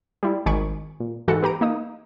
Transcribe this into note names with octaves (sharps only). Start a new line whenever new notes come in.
G3 E4
G#1 D#3 G#5 B5 C#6 D7
A#2
G#2 E3 F#4 A4 F#5 C#7
B3 G4 A#5 D7
A#3 D#4 D#6